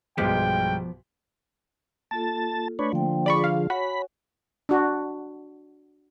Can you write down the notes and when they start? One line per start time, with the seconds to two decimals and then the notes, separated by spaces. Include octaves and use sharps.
0.18 B1 G2 F3 G#3 B3 G4 G5
2.11 A#3 F4 A4 A5
2.79 A3 D4 B4 C#5
2.93 D3 F3 A#3 C5 G5
3.26 F4 G#4 D5 B5 C#6
3.44 F5
3.70 F#4 C#5 G#5 B5
4.69 D4 F#4